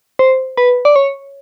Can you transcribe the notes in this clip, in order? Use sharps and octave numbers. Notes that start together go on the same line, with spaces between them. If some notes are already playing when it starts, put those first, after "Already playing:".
C5
B4
D5
C#5